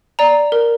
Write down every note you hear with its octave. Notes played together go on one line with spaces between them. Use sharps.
D5 A#5
A#4